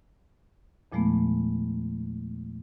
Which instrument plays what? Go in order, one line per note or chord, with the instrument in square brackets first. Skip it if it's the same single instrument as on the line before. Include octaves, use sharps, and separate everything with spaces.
[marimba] E2 A#2 F3 G#3 A3 B3